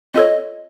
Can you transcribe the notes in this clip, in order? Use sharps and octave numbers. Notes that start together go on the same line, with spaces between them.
C4 F4 A4 C#5 D#5